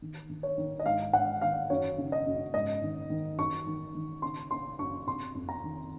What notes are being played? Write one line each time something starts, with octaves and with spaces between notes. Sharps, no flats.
D#3
D#3
C#5
D#3
D#5
G#2 F5
G#2 F#5
D#3 F5
F#2 C#5
C#3
D#5
F#2
G#2 D#5
D#3
D#3
F#2 C#6
D#3
D#3
C#3 C6
C#3 C6
F#2 C#6
C3 C6
F2
A#5
D#3